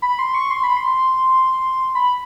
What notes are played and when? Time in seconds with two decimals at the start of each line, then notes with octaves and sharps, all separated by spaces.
0.02 B5
0.19 C6
0.34 C#6
0.51 C6
0.64 B5
0.77 C6
1.95 B5